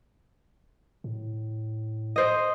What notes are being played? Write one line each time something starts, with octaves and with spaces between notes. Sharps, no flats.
A2
C5 D#5